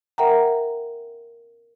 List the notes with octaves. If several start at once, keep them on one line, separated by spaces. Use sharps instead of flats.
A#4 E5 F#5 G5 A#5